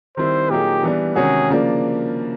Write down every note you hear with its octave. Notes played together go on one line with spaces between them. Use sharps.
D#3 G3 C4 E4 C5
A#2 F#3 A#3 D#4 G4 G#4
E3 G3 B3 D4
C3 D#3 G#3 C#4 F#4 G#4
C#3 F3 A#3 D4